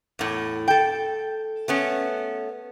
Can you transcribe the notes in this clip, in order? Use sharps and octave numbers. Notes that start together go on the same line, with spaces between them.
E2 A2
A4 G5
A3 B3 C#4